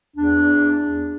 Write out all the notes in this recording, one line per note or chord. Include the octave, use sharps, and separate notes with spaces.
E2 D4